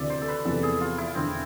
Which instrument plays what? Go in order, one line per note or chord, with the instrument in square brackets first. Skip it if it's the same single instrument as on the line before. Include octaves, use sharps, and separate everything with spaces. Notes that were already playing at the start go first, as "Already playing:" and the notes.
Already playing: [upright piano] D2 C3 E3 [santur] D5 E5
[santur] C5
A4
B4
[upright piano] E2 C3 F3 A3 [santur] A4
[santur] G#4
F4
E4
[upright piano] E1 E2 D3 [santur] C4